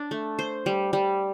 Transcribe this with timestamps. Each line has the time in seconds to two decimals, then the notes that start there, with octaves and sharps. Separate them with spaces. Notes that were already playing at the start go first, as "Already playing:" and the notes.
Already playing: D4
0.11 A3
0.39 C5
0.66 G3
0.93 G3